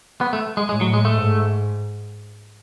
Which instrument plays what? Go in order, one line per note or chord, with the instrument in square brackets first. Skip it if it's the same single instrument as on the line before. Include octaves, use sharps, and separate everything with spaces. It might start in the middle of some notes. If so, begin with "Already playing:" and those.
[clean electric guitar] B3
A3
G#3
[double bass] A2 [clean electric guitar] G#3
[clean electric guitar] F#3
G#3
A3
[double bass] G#2